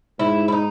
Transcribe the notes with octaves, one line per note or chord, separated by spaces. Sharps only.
G#2 E4
E4
D#4